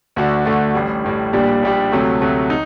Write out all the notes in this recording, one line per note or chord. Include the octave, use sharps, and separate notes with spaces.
D2 D3 A3 D4 F#4
D2 D3 A3 D4 F#4
A1 A2 G3
A1 A2 G3
A#1 A#2 G3 D4 G4
A#1 A#2 G3 D4 G4
D2 C3 F#3 A3
D2 C3 F#3 A3
D#4